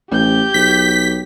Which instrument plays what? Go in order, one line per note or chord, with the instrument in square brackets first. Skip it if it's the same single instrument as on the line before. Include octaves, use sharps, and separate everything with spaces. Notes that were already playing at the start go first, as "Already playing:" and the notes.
[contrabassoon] A1 [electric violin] G4 G6
[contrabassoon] B1 [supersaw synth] B6